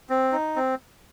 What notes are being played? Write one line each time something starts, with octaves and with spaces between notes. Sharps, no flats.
C4
D#4
C4